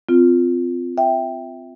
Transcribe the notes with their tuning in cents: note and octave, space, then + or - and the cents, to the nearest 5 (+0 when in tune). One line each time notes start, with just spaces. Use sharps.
C4 -25 F4 +0
E5 +0 G5 +0